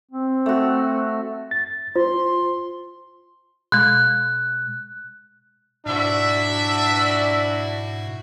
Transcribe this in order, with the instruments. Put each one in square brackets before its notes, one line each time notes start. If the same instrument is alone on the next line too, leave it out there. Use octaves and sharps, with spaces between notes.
[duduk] C4
[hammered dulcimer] A3 F#4
[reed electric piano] A6
[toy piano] F4 [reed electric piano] C5 [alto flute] C6
[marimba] B2 G#3 [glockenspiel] F#6
[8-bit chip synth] G#2 B2 [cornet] D4 [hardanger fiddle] E4 F#4 [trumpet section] E5